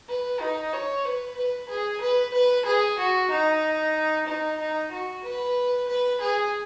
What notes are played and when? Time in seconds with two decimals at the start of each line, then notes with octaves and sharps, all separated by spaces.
0.09 B4
0.41 D#4
0.74 C#5
1.05 B4
1.37 B4
1.70 G#4
2.01 B4
2.34 B4
2.66 G#4
2.99 F#4
3.31 D#4
4.27 D#4
4.59 D#4
4.92 F#4
5.25 B4
5.88 B4
6.21 G#4